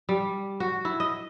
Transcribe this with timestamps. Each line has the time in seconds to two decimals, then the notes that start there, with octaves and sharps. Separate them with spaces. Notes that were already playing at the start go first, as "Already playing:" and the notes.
0.09 G3
0.60 F#4
0.85 E4
1.00 D#5